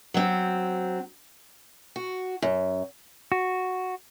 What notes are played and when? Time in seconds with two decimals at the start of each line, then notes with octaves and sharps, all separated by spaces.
0.14 F#3 C4
1.96 F#4
2.42 F#2
3.32 F#4